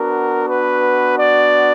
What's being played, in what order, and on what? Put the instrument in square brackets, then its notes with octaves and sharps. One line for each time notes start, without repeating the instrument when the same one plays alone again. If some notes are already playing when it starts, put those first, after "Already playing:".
Already playing: [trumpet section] B3 D4 F#4 A#4
B4
D5